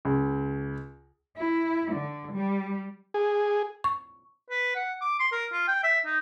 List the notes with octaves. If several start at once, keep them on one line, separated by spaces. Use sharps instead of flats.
C#2
E4
D3
G3
G#4
C#6
B4
F#5
D6
C6
A#4
F4
G5
E5
D#4